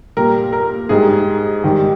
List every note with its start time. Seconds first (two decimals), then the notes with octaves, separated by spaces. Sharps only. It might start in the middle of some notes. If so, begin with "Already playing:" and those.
0.17 A#2 G3 A#4
0.53 A#4
0.89 G#2 G3 G#4
1.64 G#2 D#3 G3